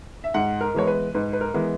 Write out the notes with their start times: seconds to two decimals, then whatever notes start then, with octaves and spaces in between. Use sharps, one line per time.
0.24 E5
0.34 G#2 F#5
0.61 A#4
0.74 E3 G#3 B3 C#5
0.87 B4
1.14 G#2 B4
1.33 B4
1.41 A#4
1.54 E3 G#3 B3